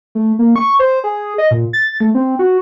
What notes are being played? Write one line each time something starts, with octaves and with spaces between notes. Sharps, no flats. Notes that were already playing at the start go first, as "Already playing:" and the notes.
A3
A#3
C#6
C5
G#4
D#5
A#2
A6
A3
C4
F#4